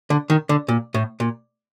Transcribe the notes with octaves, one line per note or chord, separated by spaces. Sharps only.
D3
D#3
D3
A#2
A2
A#2